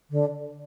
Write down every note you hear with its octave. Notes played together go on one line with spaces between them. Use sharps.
D3